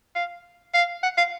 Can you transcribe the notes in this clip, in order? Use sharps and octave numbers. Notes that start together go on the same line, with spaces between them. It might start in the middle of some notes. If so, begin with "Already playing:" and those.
F5
F5
F#5
F5